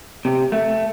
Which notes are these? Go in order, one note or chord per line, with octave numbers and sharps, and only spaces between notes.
C3
A3